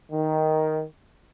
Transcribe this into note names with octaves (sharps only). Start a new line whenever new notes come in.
D#3